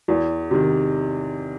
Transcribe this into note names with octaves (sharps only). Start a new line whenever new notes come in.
E2
C3 D#3